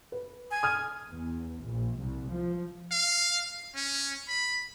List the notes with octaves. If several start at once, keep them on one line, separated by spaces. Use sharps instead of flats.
B4
G#5
D#6 F6 G#6
E2
A#1
C2
F3
F5
C#4
B5